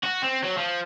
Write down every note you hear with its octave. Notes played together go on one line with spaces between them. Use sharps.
F#4
C4
F#3
F3